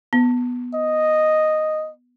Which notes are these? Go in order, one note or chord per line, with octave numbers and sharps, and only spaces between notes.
B3
D#5